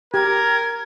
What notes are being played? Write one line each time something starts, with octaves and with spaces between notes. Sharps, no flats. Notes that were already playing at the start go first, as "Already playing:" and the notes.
G4 A#4 G#6